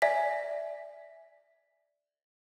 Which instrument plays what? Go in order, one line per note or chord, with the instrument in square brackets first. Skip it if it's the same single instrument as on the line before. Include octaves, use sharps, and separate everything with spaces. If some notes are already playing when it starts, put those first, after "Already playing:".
[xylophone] D5 E5 G#5 B6